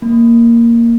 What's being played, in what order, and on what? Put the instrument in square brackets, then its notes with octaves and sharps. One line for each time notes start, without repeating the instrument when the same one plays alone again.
[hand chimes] A#3